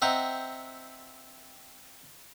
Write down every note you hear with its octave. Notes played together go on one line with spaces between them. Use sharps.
C4 D#5 E5 F#5 G5 A#5